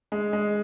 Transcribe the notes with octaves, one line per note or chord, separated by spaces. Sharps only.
G#3
G#3